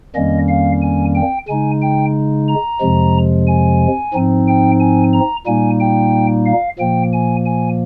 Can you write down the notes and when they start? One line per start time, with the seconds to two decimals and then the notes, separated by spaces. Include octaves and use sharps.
0.15 F2 D#3 G3 A#3 C#4 D#5
0.48 F5
0.82 G#5
1.15 G5
1.48 C#3 G#3 D#4 G#5
1.82 G5
2.48 A#5
2.80 F2 C3 F3 G#3
3.47 G#5
4.14 G#2 F3 C4 D#4
4.48 G5
4.80 G#5
5.13 A#5
5.46 A#2 G3 A#3 D#4 G#5
5.80 G5
6.46 F5
6.79 A#2 F3 A#3 G5
7.13 G#5
7.46 G#5